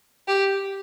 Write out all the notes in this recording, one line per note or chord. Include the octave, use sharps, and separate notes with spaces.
G4